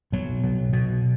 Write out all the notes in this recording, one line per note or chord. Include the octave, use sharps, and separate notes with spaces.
B2 F#3
B2
B2